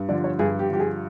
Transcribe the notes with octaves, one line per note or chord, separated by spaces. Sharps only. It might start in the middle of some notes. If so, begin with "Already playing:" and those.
Already playing: G2
D3 F3 D5
C#5
G2 G#4
G4
D3 F3 G4
G#4